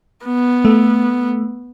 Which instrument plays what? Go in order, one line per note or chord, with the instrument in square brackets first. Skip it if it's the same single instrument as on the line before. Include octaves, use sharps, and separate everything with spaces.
[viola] B3
[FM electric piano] A3